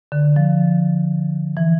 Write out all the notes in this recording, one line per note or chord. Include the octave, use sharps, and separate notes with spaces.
D3
F3
E3